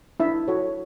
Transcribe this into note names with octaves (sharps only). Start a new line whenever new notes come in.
D4 E4 E5
F#4 A4 C#5